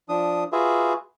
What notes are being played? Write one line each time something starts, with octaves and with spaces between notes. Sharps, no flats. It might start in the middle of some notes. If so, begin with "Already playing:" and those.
F3 D4 D#6
F4 F#4 G#4 B4 E5